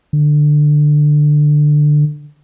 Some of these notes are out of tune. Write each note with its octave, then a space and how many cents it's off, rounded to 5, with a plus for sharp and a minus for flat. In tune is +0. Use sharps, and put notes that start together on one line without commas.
D3 +15